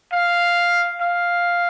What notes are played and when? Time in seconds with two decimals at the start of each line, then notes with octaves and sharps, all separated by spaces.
0.13 F5
1.01 F5